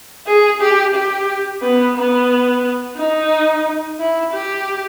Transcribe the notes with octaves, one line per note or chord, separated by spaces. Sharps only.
G#4
G4
G4
B3
B3
D#4
E4
G4